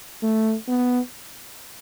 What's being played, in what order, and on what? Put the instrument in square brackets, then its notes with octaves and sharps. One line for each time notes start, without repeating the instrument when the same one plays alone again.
[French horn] A3
B3